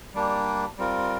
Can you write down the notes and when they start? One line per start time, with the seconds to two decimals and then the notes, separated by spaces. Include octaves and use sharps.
0.14 G3 A#3 D4 G4
0.77 G3 C4 F4 A#4